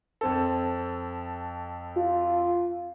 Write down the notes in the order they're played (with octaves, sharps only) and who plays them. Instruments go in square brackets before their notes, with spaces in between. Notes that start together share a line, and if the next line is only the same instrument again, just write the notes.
[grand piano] F2 C4 A4
[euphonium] F4